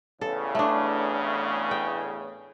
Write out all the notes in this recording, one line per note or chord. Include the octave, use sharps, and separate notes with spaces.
A1 E2 C#3 A4
A3 D4
G5